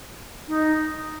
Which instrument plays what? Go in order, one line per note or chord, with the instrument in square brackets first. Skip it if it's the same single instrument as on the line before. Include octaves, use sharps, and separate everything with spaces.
[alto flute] D#4